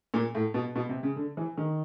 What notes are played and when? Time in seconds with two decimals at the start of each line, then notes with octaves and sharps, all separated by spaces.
0.14 A#2
0.35 A2
0.54 B2
0.75 B2
0.89 C3
1.03 C#3
1.16 D3
1.37 E3
1.58 D#3